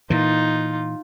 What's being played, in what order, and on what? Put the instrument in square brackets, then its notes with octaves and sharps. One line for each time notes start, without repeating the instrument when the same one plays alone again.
[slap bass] A#2 E3 [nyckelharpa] D#4 F4